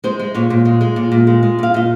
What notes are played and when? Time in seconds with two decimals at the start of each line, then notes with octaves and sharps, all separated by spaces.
0.04 G#3 C5
0.19 G#3
0.34 A#2 C#5
0.50 A#2
0.65 G#3
0.81 G#3
0.96 A#2
1.12 A#2
1.27 G#3
1.43 G#3
1.59 A#2 F5
1.74 A#2 D#5